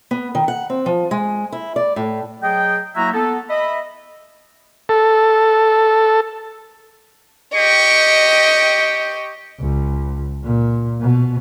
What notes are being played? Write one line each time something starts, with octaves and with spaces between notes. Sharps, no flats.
B3
D#3
F#5
C4
F3
G#3
E4
D5
A2
F#3 G#4 D#5 G5
F#3 A#3 E4 F#4 E5 A#5
B3 A4
D#5 E5 B5
A4
G4 D#5 G5 C#6
C#2
A#2
B2